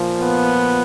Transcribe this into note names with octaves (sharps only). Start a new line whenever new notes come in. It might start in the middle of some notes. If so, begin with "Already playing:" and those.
Already playing: A#2 F3
B3